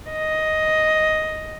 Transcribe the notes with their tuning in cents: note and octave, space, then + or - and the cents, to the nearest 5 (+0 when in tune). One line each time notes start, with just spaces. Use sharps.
D#5 +5